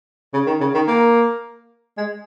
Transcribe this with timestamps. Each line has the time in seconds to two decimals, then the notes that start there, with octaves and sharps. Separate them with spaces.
0.33 C#3
0.47 D#3
0.60 C#3
0.74 D#3
0.88 A#3
1.97 G#3